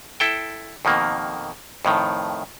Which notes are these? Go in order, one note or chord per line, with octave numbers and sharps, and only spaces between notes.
E4 A4 G5
F2 B2 D#3 A#3
F2 A2 D#3